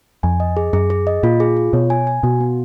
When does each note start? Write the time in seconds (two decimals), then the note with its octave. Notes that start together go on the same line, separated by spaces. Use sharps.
0.23 F2 G#5
0.40 D#5
0.57 G#4
0.73 F#2 G#4
0.90 G#4
1.07 D#5
1.23 A#2 F4
1.40 G#4
1.57 F4
1.73 B2 C#5
1.90 G#5
2.07 G#5
2.23 B2 F#4
2.40 B3